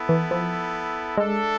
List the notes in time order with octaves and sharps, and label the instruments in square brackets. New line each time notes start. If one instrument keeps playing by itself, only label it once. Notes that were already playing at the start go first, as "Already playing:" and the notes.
Already playing: [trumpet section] B3 E4 A4
[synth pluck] E3
F3
[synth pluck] G#3 [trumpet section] D4 A4 E5